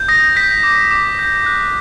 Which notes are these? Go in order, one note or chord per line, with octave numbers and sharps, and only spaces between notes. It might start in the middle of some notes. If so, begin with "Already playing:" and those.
Already playing: G6
D#6 A#6
G6 B6
D6
D6
G6
F#6